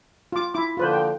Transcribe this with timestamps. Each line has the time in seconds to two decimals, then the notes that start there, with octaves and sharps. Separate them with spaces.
0.32 F4 D6
0.54 E4 D6
0.77 D3 F3 A#3 F4 B4 C5
0.93 G5